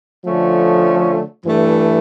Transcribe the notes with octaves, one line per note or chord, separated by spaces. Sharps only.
D3 F3 A3 C#4
G2 E3 A3